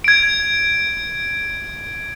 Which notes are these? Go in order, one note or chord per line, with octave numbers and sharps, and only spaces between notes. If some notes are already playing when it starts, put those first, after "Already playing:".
G#6 D7